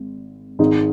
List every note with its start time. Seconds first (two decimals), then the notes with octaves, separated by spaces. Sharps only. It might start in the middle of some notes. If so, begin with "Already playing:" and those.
Already playing: G#1
0.59 G#1 G#2 D#3 D#4